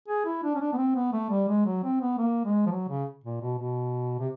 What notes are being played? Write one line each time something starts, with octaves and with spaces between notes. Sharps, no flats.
G#4
E4
D4
C#4
D4
B3
C4
B3
A3
G3
G#3
F#3
C4
B3
A#3
G#3
F3
F#3
C#3
A#2
B2
B2
C3